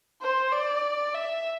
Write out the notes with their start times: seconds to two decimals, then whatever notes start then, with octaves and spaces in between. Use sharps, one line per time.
0.22 C5
0.52 D5
1.14 E5